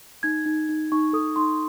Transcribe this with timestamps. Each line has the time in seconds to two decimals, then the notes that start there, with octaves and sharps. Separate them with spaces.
0.23 D#4 G#6
0.46 D#4
0.69 D#4
0.92 D#4 C#6
1.13 A4 D#6
1.36 D#4 C6